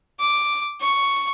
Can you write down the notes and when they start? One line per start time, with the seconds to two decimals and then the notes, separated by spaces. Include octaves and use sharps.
0.20 D6
0.81 C#6